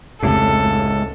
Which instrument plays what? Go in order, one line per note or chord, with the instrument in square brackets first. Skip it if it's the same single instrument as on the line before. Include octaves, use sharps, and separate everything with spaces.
[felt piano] F1 [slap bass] C#2 A2 [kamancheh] A4